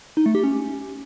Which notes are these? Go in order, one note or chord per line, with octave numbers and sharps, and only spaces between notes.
D#4
A3
G4
C#4